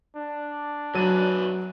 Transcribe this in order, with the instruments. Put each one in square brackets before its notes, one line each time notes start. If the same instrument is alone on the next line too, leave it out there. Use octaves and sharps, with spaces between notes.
[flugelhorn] D4
[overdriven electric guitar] F#2 B4 [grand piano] F#3 D#7